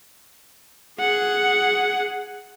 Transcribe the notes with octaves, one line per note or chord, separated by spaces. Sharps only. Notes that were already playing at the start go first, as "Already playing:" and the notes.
G#4 F#5